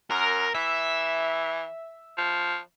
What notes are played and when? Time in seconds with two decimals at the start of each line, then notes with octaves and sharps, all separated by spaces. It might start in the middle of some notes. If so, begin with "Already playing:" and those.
0.11 F#2 A#4
0.55 E3 E5
2.18 F3